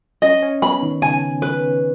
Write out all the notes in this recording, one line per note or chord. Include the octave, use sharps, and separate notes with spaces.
C#4 C#5 D#5
C#4 C#5
B3 B4 B5
D#3 D#4
C#3 C#4 G#5
B4